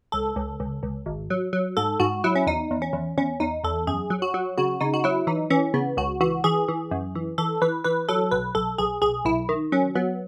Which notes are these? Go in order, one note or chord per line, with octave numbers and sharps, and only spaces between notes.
C#2 A4
C#2
C#2
C#2
G#1
F#3
F#3
G#2 A4
G#2 F#4
F#3 E4
C#4
E2 D#4
E2
C#4
E2
E2 C#4
E2 D#4
E2 A4
F#2 G#4
F#3
F#4
F#3
C#3 F#4
C#3 D#4
F#4
F#3 E4
E3 D#4
E3 C#4
C#3 B3
C#2 F#4
E3 F#4
E3 G#4
E3
F#2
E3
E3 A4
E3 B4
E3 B4
F#3 A4
B1 B4
B1 A4
B1 G#4
B1 G#4
B1 E4
D#3
F#3 C#4
F#3 B3